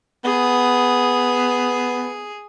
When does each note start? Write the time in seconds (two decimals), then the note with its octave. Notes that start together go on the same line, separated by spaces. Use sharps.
0.24 B3 G#4